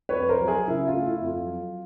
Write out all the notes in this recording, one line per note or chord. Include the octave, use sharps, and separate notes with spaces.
B4 C#5
F2
A#4 C5
F#3
G#4 A#4
C#3 E4
F4
A3
E4
F2
F4
F#3